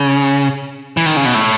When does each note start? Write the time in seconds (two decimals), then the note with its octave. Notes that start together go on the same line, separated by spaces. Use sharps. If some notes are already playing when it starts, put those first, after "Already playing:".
Already playing: C#3
0.97 E3
1.06 D#3
1.17 C#3
1.25 B2
1.34 A2